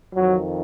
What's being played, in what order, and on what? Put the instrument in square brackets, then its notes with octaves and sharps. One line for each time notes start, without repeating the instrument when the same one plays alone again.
[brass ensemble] F2 D#3 F#3